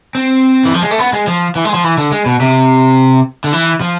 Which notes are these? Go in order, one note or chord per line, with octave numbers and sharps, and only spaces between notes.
C4
E3
F3
G#3
A3
B3
G#3
F3
E3
G#3
F3
E3
D3
G#3
B2
C3
D3
E3
F3